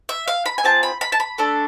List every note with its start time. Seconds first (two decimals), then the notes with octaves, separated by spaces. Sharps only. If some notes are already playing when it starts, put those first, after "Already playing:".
0.09 E5
0.28 F5
0.46 B5
0.58 G#5
0.64 C4 F4 G#4 A5
0.83 B5
1.01 B5
1.12 A5
1.20 B5
1.38 A3 D4 A4